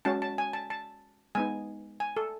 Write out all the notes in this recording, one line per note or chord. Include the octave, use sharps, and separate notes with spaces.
G#3 C#4 F#4 A5
A5
G#5
A5
A5
G#3 B3 D#4 G#5
G#5
A4